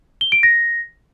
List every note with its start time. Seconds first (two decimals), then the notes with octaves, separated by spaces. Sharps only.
0.21 G7
0.32 D7
0.43 A#6